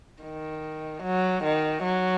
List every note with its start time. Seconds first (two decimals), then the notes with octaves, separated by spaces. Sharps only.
0.23 D#3
1.03 F#3
1.44 D#3
1.84 F#3